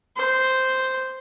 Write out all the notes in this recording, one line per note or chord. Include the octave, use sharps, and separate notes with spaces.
C5